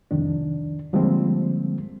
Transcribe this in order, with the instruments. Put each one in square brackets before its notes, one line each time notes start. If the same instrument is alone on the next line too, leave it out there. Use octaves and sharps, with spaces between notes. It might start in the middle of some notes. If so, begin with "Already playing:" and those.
[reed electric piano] C2 F2 D#3 D4
D3 F3 G3 G#3 A#3 C4